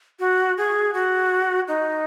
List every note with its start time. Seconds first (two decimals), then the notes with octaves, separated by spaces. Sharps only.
0.19 F#4
0.58 G#4
0.94 F#4
1.68 D#4